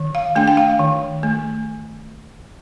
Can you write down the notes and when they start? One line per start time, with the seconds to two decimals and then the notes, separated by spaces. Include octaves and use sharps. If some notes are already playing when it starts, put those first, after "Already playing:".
Already playing: D#3
0.15 F5
0.36 A3 D4 G5
0.48 G5
0.57 F5
0.79 D#3
1.23 A3